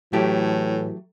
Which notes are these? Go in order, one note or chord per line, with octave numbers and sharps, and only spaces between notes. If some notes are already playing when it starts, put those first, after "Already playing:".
A2 E3 F#3 A3 G4